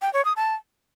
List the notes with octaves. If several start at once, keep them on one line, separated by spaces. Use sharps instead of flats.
G5
C#5
D#6
A5